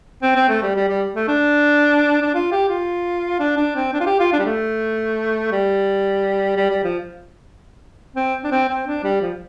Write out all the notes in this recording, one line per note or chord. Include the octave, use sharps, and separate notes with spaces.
C4
C4
A3
G3
G3
G3
A3
D4
D4
F4
G4
F4
D4
D4
C4
D4
F4
G4
F4
D4
G3
A3
G3
G3
G3
F3
C4
D4
C4
C4
D4
G3
F3